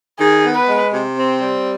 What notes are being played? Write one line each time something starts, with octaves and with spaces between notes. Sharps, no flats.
D#3 G#4
B3
B4
G#3
C3
C4
G3